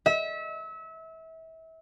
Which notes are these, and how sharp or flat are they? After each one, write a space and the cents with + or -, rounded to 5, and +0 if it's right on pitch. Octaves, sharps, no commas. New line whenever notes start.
E5 -30